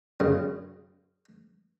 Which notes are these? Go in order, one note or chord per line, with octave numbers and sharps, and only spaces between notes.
F#2 C#3